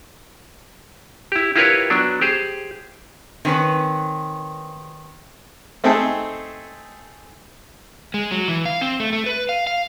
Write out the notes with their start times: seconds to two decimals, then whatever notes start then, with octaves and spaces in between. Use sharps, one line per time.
1.32 E4 G4
1.56 E4 F4 G4 A#4 B4 C#5
1.90 F#3 B3 D4
2.21 G4 G#4 C5
3.45 D#3 C4 C#4 B4
5.84 A3 C4 D#4 G#4 A4 G5
8.14 G#3
8.31 F#3
8.48 E3
8.66 F5
8.81 C4
9.00 A3
9.13 A3
9.26 B4
9.49 F5
9.67 F5